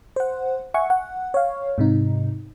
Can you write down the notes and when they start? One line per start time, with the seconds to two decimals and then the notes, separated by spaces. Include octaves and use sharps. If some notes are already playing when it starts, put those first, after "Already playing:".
0.16 C5 F#5
0.74 E5 F#5 G#5 C#6
0.90 F#5
1.34 C#5 F5
1.78 G#2 C3 D#4